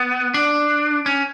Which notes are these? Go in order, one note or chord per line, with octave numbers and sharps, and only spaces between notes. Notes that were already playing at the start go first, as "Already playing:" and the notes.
Already playing: B3
D4
C#4